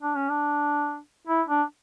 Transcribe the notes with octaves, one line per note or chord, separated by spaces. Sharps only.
D4
C#4
D4
E4
D4